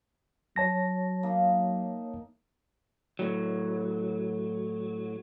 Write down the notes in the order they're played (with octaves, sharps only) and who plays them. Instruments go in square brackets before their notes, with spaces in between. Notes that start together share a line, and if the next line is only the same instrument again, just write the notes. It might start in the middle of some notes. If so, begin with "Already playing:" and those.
[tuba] F#3 [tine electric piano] C#5 A5 A#6
[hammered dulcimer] A#3 D#4 E5
[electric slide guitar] A2 F#3